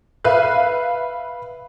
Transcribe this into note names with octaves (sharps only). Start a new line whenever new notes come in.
B4 E5 F5 F#6